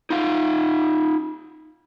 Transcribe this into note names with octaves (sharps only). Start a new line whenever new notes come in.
D#4 F4 F5